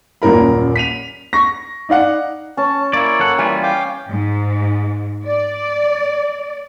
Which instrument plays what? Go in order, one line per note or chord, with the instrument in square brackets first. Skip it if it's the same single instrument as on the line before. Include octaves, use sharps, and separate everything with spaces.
[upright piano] D#1 F#2 A#2 A#4 B5
B6 D#7 F7
C#6 A#6
D#4 D5 F5 F#5
[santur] C#4 [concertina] A5
[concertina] A#3 C#5 [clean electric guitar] E4 D5
[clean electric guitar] F#2 A4 F#5
[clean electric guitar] E3 G3 F4 [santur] G#5
[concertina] F5 G5 D6
[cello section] G#2
D5